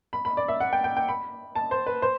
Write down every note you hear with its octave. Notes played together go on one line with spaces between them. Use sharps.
B5
B5
D5
E5
F#5
G5
G5
G5
B5
A5
C5
B4
C5